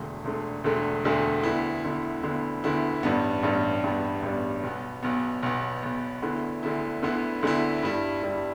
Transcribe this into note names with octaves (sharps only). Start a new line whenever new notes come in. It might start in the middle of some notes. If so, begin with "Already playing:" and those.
Already playing: E1 D2 D3 A3
E1 D2 D3 A3
E1 D2 D3 A3
E1 D2 D3 A3
D2 D3 B3 E4
D2 D3 B3 E4
D2 D3 B3 E4
D2 D3 B3 E4
A1 G2 G3 B3
A1 G2 G3 B3
A1 G2 G3 B3
A1 G2 G3 B3
B1 B2 B3
B1 B2 B3
B1 B2 B3
B1 B2 B3
D2 D3 B3 E4
D2 D3 B3 E4
D2 D3 B3 E4
D2 D3 B3 E4
G2 G3 E4
G2 G3 E4